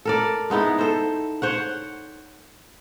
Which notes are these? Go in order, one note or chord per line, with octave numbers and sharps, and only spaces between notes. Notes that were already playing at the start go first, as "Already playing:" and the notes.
A4 A#4 D5
G#3 B3 D#4 E4
A4 C5
C5 C#5 F#5